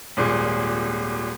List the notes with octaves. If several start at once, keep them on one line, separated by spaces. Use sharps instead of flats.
D#1 G#1 A#2 G#4